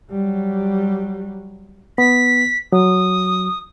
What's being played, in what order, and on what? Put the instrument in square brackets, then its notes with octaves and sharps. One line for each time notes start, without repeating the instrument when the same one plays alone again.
[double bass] F#3 G3
[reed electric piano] B3 [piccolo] B6
[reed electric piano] F#3 [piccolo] D#6